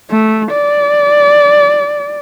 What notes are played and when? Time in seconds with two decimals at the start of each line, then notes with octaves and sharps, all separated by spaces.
0.10 A3
0.52 D5